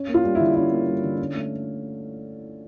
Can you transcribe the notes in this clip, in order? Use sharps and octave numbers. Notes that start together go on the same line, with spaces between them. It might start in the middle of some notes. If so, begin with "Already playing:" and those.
Already playing: C#4
A#3
F4
G3
E4
D3
C#4 E4
A#3
G3
D3
C#4
A3